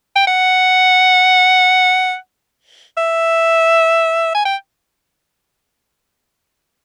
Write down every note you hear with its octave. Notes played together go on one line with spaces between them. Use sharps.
G5
F#5
E5
G#5
G5